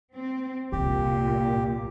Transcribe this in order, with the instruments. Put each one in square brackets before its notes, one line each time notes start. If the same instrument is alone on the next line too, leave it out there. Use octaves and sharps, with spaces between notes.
[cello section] C4
[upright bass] C2 F2 [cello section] A#2 [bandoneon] G4